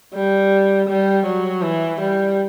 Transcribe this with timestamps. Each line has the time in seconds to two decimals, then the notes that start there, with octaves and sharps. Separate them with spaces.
0.14 G3
0.89 G3
1.26 F#3
1.62 E3
2.01 G3